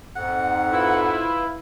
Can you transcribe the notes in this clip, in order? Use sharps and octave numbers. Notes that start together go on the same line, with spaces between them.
F2 G#2 F#5
E4 F4 B4